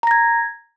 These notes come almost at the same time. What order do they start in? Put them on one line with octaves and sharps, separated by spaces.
A#5 A#6 G#6